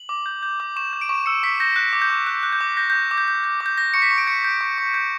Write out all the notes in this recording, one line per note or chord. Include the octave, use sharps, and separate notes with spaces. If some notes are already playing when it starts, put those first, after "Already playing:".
Already playing: F#7
D6
G6
G6
D6
C#6 E7
G6
D7
C#6
E6 C#7
C#6 B6
G6 A#6
F#6
D6
G6
D6
F#6
F#6
G6
D6
G6 A#6
D6 G6
D6
G6
G6
G6
D6
G6
G6 A#6
C#6 C#7
B6
C#6
D7
G6 C#7
G6
C#6
C#6
G6